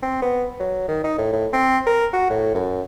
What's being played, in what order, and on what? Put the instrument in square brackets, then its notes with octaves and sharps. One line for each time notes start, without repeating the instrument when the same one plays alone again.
[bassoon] C4
B3
F#3
D#3
D#4
A2
A2
C4
A#4
F#4
A2
F#2